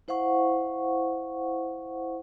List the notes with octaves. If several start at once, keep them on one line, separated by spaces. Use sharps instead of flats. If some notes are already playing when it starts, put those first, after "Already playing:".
E4 C5 F5 F#5 C#6